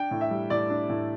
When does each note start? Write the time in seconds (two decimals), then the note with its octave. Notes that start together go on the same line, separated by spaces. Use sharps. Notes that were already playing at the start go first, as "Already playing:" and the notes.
Already playing: D4 G5
0.11 A2
0.21 E5
0.31 G3
0.50 A2 D5
0.70 D4
0.89 A2